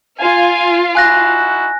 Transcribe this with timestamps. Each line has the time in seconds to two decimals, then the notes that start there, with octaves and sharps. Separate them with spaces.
0.20 F4 F5 G#5
0.95 D#4 E4 F#4 G#5 F#6 A#6